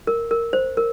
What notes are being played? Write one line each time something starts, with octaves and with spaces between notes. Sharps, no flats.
A#4
A#4
C5
A#4